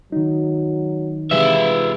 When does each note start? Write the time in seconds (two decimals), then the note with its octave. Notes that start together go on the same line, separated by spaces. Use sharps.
0.12 D#3 F#3 D#4
1.31 C3 E3 G#3 F4 B4 E5